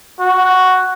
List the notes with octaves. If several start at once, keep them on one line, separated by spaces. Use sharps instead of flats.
F#4